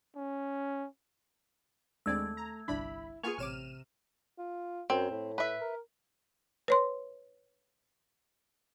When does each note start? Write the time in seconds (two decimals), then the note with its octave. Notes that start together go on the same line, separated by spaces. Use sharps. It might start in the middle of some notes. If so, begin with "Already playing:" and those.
0.16 C#4
2.06 D#2 G#3 A3 C4 D4 D5 E6 G#6
2.37 A#5
2.68 G1 C2 D4 E4 B5
3.23 A#3 B3 F4 G#4 G#5 C#6 F7
3.38 A1 C3 C#5 D6 F6 D#7 E7
4.38 F4
4.90 F#2 C4
5.11 A2
5.38 B4 E5
5.61 A#4
6.68 B4 C#5 C6